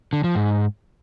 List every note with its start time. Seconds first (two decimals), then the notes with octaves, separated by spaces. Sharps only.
0.13 D3
0.24 F3
0.35 G#2